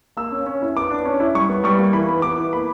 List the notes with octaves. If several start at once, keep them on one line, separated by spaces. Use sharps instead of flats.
A#3 E6
C#4
C#4
E4
B3 D6
D4
C#4
E4
G3 C#6
B3
G3 C#6
A#3
E3 B5
B3
B3 D6
E4
A#3 B5